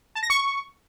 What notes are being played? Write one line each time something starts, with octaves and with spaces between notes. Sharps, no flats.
A5
A#6
C#6